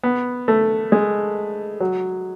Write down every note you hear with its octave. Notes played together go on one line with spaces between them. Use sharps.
B3
A3
G#3
F#3